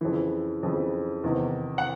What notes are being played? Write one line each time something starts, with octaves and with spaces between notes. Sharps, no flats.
F2 C#3 E3
F2 C#3 E3
E2 C3 D#3
F#5